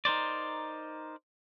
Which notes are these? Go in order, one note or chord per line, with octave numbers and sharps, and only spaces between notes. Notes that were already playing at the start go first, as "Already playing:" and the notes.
D#4 A#4 C5 D5